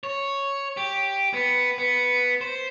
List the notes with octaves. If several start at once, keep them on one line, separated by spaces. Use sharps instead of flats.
C#5
G4
B3
B3
C5